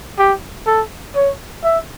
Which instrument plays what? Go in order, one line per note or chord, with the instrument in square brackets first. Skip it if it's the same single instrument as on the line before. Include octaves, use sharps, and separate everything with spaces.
[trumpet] G4
A4
C#5
E5